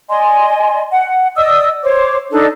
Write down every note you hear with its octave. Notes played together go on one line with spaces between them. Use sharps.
D5 D#5 G#5 C6
F#5
D5 D#5 D#6 E6
C5 C#5 D6
D4 D#4 A4 D5